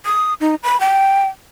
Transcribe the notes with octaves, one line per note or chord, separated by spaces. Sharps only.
D#6
D#4
B5
G5